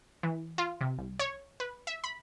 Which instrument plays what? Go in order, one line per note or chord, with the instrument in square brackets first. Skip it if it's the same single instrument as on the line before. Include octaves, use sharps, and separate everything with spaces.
[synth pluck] E3
F4
C3
C2
C#5
B4
E5
B5